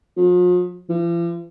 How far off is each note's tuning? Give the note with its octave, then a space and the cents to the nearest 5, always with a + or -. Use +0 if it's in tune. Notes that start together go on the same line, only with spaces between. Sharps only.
F3 +45
F3 -45